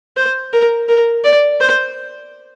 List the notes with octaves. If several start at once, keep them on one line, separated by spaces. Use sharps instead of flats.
C5
A#4
A#4
D5
C5